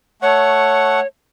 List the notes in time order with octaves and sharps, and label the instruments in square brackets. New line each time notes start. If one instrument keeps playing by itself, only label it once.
[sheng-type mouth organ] A3 F#5 C#6 [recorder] C#5